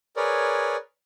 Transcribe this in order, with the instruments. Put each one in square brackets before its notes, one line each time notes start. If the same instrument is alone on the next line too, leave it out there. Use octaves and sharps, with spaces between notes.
[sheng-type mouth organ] G#4 A#4 B4 C#5 D5